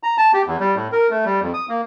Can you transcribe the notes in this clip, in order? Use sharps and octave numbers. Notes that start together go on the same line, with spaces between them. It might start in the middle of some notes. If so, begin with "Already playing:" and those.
A#5
A5
G4
E2
G3
A2
A#4
A3
G3
F2
D#6
A#3